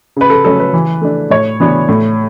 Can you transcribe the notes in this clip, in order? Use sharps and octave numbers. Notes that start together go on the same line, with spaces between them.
C#3 B4
A4
F#3 A3 C#4 A4
B4
E3
A3 D4
A2 C#5
E3 B3 D4
A2